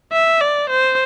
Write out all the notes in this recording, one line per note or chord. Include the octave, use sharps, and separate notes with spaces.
E5
D5
C5